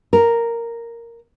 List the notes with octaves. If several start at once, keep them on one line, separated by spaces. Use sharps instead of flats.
A#4